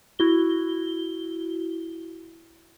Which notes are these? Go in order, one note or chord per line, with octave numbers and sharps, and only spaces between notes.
E4 F#4 G7